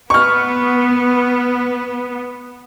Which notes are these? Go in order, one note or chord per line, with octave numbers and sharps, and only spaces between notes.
B3 C#6 F6